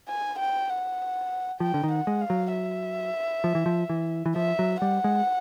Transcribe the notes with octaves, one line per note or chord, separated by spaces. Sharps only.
G#5
G5
F#5
F3 G5
D3
D#3
F#5
G#3
F5
F#3
E5
F3
E3
F3
E3
E3
F3 E5
F#3
G3 F#5
G#3